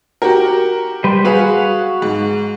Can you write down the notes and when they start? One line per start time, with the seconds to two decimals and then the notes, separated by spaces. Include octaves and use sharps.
0.22 F#4 G4 A#4
1.04 G3 B4 C5
1.25 F#4 G#4 B4 F5 F#5
2.02 G#2